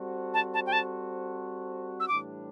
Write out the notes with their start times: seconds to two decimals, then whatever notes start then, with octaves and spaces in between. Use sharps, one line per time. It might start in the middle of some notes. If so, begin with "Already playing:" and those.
Already playing: G3 C4 F#4 A4 C5
0.34 A5
0.54 A5
0.66 G5
0.73 A5
2.00 E6
2.08 A2 E3 G3 D4 G4 D6